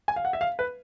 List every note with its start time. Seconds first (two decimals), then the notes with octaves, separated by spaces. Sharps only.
0.08 G#5
0.16 F5
0.25 F#5
0.33 E5
0.41 F5
0.59 B4